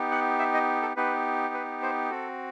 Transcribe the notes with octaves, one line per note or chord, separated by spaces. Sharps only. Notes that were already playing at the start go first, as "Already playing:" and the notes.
Already playing: B3 D#4 G4
F#5
E5
D#5
A4
B3 D#4 G4 B4
B4
C5
C4 F#4 A4